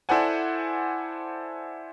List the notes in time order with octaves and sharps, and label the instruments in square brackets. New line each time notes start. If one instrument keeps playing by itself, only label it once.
[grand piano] E4 A4 C5 D5 F#5 G#5